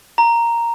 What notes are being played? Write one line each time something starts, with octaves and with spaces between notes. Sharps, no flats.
A#5